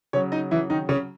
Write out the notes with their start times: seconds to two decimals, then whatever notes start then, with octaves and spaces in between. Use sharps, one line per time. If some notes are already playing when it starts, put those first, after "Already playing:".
0.13 C#3 F#3 C#4 C#5
0.32 D#4 D#5
0.51 E3 E4
0.70 D#3 D#4
0.89 C#3 C#4